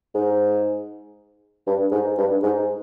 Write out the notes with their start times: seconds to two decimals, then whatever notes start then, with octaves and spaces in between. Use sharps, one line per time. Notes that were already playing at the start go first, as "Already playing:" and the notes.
0.15 G#2
1.67 G2
1.92 G#2
2.18 G2
2.43 G#2